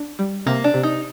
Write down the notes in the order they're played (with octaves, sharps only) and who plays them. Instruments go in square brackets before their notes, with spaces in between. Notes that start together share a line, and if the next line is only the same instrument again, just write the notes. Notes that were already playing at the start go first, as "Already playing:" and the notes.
Already playing: [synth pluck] D4
G3
[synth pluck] C3 [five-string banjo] A#3
[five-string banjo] D4
[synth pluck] C3
[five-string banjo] D#4